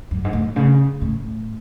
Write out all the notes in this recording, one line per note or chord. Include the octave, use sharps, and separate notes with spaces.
F#2
G#2
A2
C#3
A2